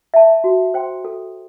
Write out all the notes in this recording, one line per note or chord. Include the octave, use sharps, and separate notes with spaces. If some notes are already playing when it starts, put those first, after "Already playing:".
E5 A5
F#4
C5 G5 C6
A4